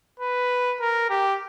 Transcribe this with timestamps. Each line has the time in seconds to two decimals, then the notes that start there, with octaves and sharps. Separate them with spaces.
0.20 B4
0.81 A#4
1.10 G4